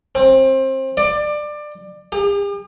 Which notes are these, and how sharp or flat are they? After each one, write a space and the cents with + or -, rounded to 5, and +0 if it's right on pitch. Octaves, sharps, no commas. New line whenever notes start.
C4 +25
D5 +20
G4 +45